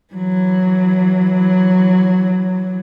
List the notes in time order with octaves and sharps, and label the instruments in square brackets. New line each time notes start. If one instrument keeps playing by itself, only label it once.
[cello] E3 F#3